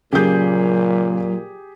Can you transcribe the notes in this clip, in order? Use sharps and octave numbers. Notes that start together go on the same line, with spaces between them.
A#2 C#3 F#3 A#3 G4 G#4 G6